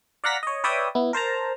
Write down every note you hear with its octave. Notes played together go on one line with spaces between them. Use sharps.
D5 F5 F#5 A#5 A#6 B6
C#5 D#5
B4 C#5 D5 E5 G5 D#6
B3 E4
A#4 C5 A5 A#5